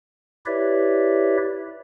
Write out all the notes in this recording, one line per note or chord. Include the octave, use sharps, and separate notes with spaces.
E4 G4 B4 C#5 D5 E5